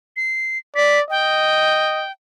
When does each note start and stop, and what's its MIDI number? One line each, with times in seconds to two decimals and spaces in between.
0.17 0.58 96
0.76 1.02 74
0.76 0.99 95
1.10 2.04 75
1.10 2.12 79